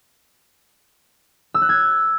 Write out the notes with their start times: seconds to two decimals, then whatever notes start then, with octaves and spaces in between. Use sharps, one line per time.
1.54 E6
1.62 F#6
1.69 G#6